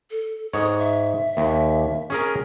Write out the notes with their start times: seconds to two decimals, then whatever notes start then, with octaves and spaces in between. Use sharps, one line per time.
0.11 A4
0.53 G#2 C#5 D#6
0.78 E5
1.37 D#2
2.10 C#4 G#4 A#4